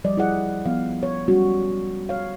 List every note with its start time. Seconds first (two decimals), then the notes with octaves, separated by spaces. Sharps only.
0.04 F3 G3 D5 D#5
0.17 E4 G#4 D5 D#5 F#5
0.66 F3 B3 F5
1.03 C#5
1.28 F#3 G3 C#4 F#4
2.09 C#5 F5